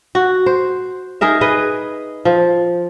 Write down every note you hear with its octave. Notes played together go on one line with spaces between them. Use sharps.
F#4
C5
D#4 G#4 A#4 E5
G#4 B4 D#5
F3